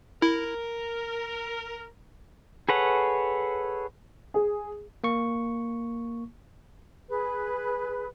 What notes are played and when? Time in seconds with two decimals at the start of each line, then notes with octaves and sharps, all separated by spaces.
0.22 E4 A#4
2.69 G#4 A4 B4 C#5 F#5
4.34 G#4
5.04 A#3 C#6
7.09 G#4 B4